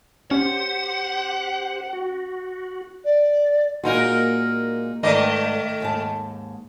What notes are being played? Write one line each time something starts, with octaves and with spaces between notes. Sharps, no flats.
C#4 G4 C5 F#5
F#4
D5
A#2 G#3 A#3 D#4 F#4 A#4
G#2 D#3 A3 B4 D5 D#5
D#2 G#2 A5